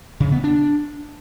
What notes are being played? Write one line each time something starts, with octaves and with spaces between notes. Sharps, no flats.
C#3
B3
D4